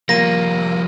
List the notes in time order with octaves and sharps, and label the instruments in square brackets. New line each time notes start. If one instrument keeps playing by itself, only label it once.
[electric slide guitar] F3 G3 [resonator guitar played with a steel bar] A#3 [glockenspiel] A#6 D#7